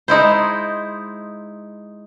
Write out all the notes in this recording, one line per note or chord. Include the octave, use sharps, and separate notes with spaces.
G#3 D#4 E4 C5